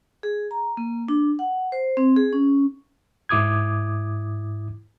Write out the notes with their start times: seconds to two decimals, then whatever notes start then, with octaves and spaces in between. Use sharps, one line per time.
0.23 G#4
0.51 A#5
0.77 A#3
1.08 D4
1.39 F#5
1.72 C5
1.97 C4
2.17 G#4
2.33 C#4
3.29 G#2 E4 D6 D#6 G#6